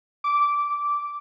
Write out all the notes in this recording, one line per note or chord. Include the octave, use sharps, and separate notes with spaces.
D6